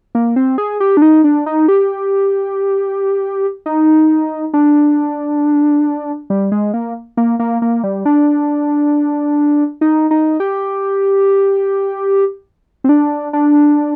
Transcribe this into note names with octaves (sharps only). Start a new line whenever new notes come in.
A#3
C4
G#4
G4
D4
D#4
D4
D#4
G4
D#4
D4
G3
G#3
A#3
A#3
A#3
A#3
G3
D4
D#4
D#4
G4
C4
D4
D4